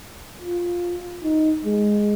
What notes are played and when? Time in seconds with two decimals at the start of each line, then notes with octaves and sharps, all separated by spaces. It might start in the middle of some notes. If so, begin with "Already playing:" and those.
0.42 F4
1.23 D#4
1.65 G#3